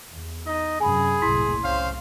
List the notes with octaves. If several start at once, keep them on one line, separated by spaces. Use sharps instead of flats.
E2
D#4 D#5
F#2 C3 G#4 G#5 B5
F#1 C2 A2 E4 C6 B6
C2 C#4 C5 F5